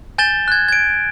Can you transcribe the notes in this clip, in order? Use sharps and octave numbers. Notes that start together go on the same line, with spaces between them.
G#5 G6 A6 E7 G7
F#6 G#6
G#6 D7